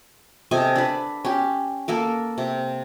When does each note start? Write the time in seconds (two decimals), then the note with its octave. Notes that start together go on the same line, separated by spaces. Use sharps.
0.51 C3 A4 D#5 G#5
0.76 D4 B4
1.25 C#4 G4
1.88 A#3 A4 A#4
2.38 C3